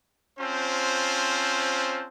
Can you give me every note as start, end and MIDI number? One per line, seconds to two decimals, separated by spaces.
0.39 2.08 60
0.39 2.08 61
0.39 2.08 65
0.39 2.08 72
0.39 2.08 81